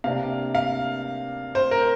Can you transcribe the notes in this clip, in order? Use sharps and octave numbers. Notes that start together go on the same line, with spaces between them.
C3 A#3 D4 F5
F5
C5
A#4